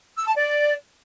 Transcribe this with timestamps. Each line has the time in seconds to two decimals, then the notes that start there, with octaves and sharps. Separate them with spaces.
0.19 E6
0.27 A5
0.36 D5